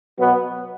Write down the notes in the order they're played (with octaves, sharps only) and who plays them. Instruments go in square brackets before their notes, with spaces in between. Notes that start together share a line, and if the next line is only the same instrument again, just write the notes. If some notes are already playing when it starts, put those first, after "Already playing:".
[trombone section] B2 F#3 B3